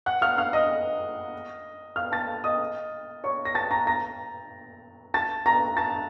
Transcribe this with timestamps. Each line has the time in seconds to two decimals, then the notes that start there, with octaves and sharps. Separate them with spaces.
0.06 F#5 F#6
0.21 F5 F6
0.38 F5 F6
0.53 D#5 D#6
1.96 F5 F6
2.12 A5 A6
2.44 D#5 D#6
3.24 C#5 C#6
3.45 A#6
3.55 A5 A6
3.71 A#5 A#6
3.87 A#5 A#6
5.14 A5 A6
5.46 A#5 A#6
5.77 A5 A6